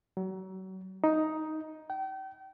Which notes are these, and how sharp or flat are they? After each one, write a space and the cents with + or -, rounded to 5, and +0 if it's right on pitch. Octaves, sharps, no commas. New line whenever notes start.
F#3 +35
D#4 +10
G5 -35